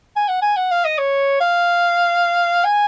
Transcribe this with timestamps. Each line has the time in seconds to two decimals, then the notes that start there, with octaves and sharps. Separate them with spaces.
0.16 G#5
0.28 F#5
0.42 G#5
0.57 F#5
0.71 F5
0.85 D#5
0.98 C#5
1.41 F5
2.64 G#5